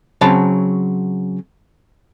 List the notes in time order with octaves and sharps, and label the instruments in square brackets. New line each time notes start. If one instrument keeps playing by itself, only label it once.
[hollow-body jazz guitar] C#3 F#3 C4 C#5 A5 B5